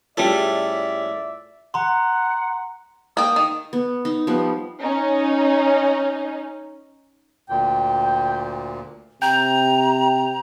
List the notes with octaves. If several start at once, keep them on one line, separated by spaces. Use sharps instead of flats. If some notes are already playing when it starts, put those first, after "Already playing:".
A2 G3 C#4 F4 G#4 A4 D5 E5
F#5 A#5 C6
A#3 G5 D#6
D#3
B3
D#4
F3 G3 B3
C#4 D#4
D2 A#2 G5
C3 G5 A#5